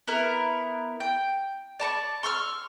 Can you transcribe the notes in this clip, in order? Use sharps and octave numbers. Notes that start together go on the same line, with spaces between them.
B3 E4 A#4
G5
D5 A5 A#5 C#6
C6 C#6 E6 F6